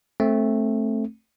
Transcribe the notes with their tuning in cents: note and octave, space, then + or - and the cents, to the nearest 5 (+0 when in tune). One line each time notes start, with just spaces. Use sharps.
A3 +0 C4 +20